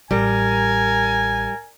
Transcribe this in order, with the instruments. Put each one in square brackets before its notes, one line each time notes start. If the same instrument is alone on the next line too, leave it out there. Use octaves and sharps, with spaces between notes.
[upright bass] A1 [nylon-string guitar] G3 [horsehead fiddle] A#4 [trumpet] G#5